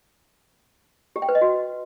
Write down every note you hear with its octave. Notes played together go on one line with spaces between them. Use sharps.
G4
G5
B4
D#5
F#4